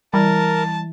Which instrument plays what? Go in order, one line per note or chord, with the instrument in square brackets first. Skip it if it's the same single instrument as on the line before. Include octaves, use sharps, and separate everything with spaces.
[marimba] E3 E4 [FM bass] G3 [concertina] A#4 [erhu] A5